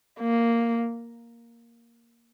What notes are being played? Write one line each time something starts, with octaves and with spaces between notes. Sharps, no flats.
A#3